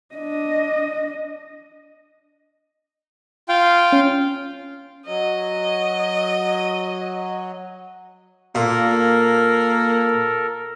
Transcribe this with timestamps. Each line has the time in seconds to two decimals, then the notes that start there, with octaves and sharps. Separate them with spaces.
0.15 D4 D#5
3.49 F4 F5 G5
3.92 C#4
5.07 F#3 D#5
8.55 A#2 A#3 A4 A#4